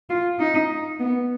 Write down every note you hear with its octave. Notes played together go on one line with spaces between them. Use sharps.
F4
D#4
B3